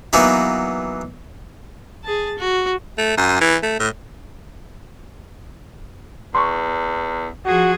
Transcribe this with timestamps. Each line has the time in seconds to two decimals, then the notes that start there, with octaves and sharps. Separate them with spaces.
0.13 E3 F#3 A#3 B3 D#4 F#4
2.04 G#4 A5
2.39 F#4
2.98 A3
3.17 F#2
3.41 E3
3.63 A3
3.80 A2
6.35 E2 C6 C#6
7.46 F3 F#4 G#4